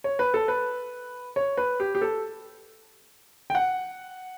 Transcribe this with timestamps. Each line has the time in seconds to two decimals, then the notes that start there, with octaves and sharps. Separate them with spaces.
0.04 C#5
0.19 B4
0.34 A4
0.48 B4
1.36 C#5
1.57 B4
1.80 G4
1.95 G4
2.02 A4
3.50 G5
3.55 F#5